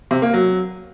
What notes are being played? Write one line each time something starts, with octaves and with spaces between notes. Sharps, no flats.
C3
A#3
F#3